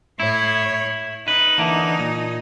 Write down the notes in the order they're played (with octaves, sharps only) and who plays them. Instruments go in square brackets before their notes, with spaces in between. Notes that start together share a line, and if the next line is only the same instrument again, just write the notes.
[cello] A2 C#5 [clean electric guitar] E4
[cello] D#4 [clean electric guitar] B4
[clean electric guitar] D3 E3 A#3
A#2